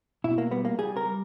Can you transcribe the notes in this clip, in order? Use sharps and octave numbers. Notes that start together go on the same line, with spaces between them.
B2 E4
A#3
G3 B3
A#3
G3 G#4
A#4
G3